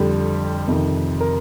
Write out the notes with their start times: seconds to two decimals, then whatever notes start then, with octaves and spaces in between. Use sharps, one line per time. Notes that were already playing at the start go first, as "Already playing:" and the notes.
Already playing: F2 D3 G3 G4
0.67 F2 C3 D#3
1.20 A#4